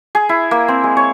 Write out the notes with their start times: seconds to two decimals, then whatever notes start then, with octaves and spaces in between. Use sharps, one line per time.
0.15 G#4
0.29 E4
0.51 A#3
0.68 C4
0.84 G#3
0.97 C#5